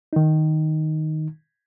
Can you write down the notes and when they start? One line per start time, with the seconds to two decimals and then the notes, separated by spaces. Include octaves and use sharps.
0.13 D#3 D#4